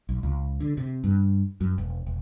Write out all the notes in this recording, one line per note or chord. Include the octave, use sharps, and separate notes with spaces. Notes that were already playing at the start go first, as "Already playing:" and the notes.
B1
C#2
D3
C3
G2
F#2
E1
E1